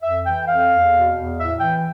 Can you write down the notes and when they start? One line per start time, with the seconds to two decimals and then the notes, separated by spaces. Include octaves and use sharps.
0.02 F2 E5
0.25 E3 G5
0.48 F2 F5
0.70 E2
0.93 B2
1.15 E2
1.38 A2 E5
1.59 E3 G5